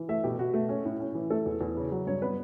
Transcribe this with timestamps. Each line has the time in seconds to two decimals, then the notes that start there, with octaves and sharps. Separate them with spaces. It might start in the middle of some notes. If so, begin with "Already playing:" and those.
Already playing: E3
0.09 A3 E5
0.24 B2 G4
0.39 B2 F#4
0.54 A3
0.69 C#4
0.85 A2
1.00 C#4
1.15 E3
1.30 A3 A4
1.46 E2
1.61 E2
1.77 C#3
1.92 F#3
2.07 G2 C#5
2.22 B3 B4